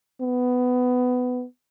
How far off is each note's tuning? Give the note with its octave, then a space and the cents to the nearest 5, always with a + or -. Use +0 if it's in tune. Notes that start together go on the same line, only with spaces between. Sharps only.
B3 +15